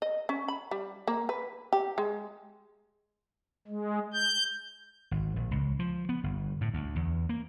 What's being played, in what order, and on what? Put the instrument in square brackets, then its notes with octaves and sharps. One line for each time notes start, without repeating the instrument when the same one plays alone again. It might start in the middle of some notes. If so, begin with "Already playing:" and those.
[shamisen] D#5
C#4
B5
G3
A#3
B4
G4
G#3
[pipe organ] G#3
G6
[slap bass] G#1
A#1
C#2
F3
B3
G1
A2
D2
E2
A#3